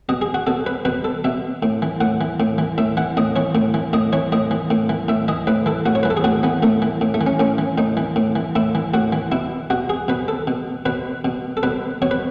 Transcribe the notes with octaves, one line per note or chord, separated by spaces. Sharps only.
B2 D#5
G#4
F#4
B2 A4
B4
B2 B4
A4
B2 E5
A2
E3
A2 F#5
E3
A2
E3
A2 E5
E3 F#5
A2 D#5
E3 C#5
A2
E3
A2 D#5
E3 C#5
A2 D#5
E3
A2
E3
A2 E5
E3 D#5
A2 B4
E3 A4
A2 F#4
C#5
E3 B4
A4
G#4
A2 F#4
E3 B3
A2 A3
E3
A2
A3
E3
C#4
A2 C#4
E3
A2 D#4
E3
A2
E3
A2 E4
E3
A2 F#4
E3
B2 E4
B2 F#4
G#4
B2 B4
A4
B2
B2 B4
B2
A4
B2 B4
B2 C#5
B4